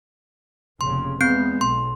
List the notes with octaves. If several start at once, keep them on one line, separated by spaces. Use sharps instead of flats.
F1 A#2 C#3 C6
E2 G#3 B3 C4 G6 C7
B1 C6